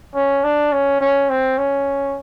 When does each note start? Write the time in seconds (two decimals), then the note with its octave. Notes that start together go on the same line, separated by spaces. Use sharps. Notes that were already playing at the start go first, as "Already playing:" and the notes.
0.15 C#4
0.44 D4
0.72 C#4
1.01 C#4
1.30 C4
1.58 C#4